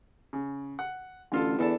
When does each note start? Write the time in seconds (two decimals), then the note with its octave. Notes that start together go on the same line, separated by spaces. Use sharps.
0.33 C#3
0.79 F#5
1.32 A1 D3 F4 A4
1.59 E2 D4 A4 A5